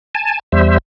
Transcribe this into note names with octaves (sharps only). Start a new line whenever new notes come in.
G#5 A5
E2 G3 C5 E5